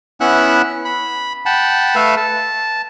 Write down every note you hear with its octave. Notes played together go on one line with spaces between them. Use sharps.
B3 C#4 E4 E5 F#5 F#6
B5
F#5 G5 A5 B5
A3 A4 B4 E5 F5
A5